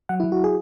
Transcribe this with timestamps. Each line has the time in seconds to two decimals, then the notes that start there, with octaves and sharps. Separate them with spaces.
0.09 F#3 F#5
0.20 E4
0.24 F#3
0.32 F#4
0.44 G#4